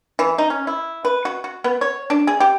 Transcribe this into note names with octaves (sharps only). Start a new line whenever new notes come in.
E3
D#4
C#4
E4
B4
F#4
F#4
B3
C#5
D4
G#4
G4